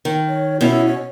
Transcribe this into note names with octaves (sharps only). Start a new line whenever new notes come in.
D#3
C#5
B2 C#4 E4
C#5